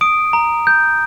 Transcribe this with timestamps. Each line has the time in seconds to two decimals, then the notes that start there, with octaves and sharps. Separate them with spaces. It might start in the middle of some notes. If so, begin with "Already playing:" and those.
0.01 D#6 D7
0.33 A#5
0.67 G6